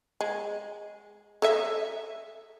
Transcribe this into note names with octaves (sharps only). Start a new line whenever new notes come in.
G#3
A4 D#5 E5